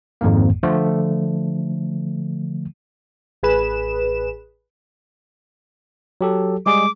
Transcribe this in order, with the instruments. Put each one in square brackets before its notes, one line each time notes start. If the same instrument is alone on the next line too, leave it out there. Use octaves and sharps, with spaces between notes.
[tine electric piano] G#1 F2 G#2 A#3
D3 F3 A3
[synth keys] A1 G#4 B4 E7
[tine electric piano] F#3 G4 A4
[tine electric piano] G3 G#3 G#4 [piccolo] D6